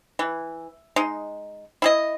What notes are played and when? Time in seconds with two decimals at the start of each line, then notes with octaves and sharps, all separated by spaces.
0.19 E3
0.96 G#3 D#4
1.82 E4 G#4 D#5